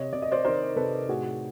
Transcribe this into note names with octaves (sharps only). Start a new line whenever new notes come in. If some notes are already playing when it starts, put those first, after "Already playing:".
Already playing: C3 C#5 D#5
C3 D5
D#5
C5 D5
D#3 A#4 C5
C3 A4 B4
A2 F#4 G#4